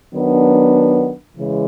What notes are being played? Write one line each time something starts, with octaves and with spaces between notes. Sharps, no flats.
D#3 F#3 B3 D4
C#3 E3 G#3